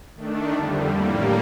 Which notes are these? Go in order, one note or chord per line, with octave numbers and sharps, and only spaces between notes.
D#3 A3 D4
F2 D3 G3
A2 G3 A#3